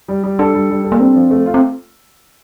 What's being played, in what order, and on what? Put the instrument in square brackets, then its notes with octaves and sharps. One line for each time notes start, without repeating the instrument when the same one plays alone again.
[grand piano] G3
G3
[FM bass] D4 [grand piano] A4
[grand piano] G3
G3
A4
[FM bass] A#3
[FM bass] C4 [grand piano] D4
[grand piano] F3
A3
F4
[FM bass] C4